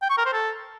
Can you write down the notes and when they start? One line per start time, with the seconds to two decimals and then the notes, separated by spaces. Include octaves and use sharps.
0.02 G5
0.10 C#6
0.18 A#4
0.25 C5
0.33 A4